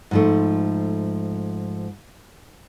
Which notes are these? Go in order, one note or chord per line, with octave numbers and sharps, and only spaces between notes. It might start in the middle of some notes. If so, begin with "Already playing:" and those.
G#2 F3 A3